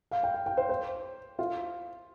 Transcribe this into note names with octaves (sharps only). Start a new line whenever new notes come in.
F5
G5
F5
G5
C5
C5
F4